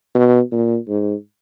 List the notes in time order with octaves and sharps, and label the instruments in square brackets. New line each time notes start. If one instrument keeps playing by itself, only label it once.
[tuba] B2
A#2
G#2